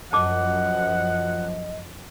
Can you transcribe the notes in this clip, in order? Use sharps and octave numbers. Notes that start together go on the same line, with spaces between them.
F#2 F3 D#5 F#5 A5 D6